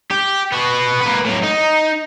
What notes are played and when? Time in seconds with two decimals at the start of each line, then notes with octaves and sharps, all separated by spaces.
0.11 G4
0.52 B3 F#4
1.02 A#3 B4
1.26 A2 F#3
1.43 D#4